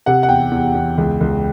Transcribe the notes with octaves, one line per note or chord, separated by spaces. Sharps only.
C3 F#5
F#5
E2 G5
E2
E2
C#2
C#2